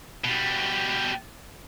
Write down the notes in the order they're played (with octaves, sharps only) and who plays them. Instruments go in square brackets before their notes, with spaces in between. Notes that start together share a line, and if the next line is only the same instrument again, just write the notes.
[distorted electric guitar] B2 G3